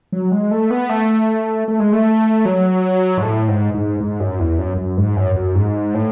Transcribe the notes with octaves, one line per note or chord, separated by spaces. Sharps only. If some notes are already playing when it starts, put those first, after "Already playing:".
F#3
G#3
A3
B3
A3
A3
G#3
A3
F#3
G#2
A2
G#2
G#2
G#2
F#2
E2
F#2
F#2
G#2
F#2
F#2
G#2
A2